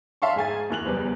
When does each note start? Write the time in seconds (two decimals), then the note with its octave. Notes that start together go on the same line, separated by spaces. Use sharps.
0.22 E5 F5 A5 C6 C#6
0.36 G#2 G#4 G#5 A6
0.70 D#2 E4 F#6 F7 F#7
0.85 F#1 E2 G3 B4 C5